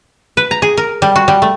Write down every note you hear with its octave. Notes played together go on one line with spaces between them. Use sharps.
B4
A#5
G#4
A#4
G3
F#4
G3
A3